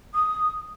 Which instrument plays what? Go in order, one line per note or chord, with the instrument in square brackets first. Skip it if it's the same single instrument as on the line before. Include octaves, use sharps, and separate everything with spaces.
[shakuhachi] D#6